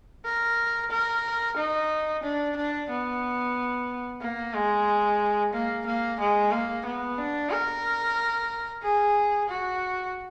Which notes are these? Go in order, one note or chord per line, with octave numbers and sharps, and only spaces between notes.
A#4
A#4
D#4
D4
D4
B3
A#3
G#3
A#3
A#3
G#3
A#3
B3
D4
A#4
G#4
F#4